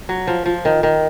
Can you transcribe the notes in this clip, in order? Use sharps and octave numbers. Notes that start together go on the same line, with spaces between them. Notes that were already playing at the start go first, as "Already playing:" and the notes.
F#3
F3
F3
D#3
D#3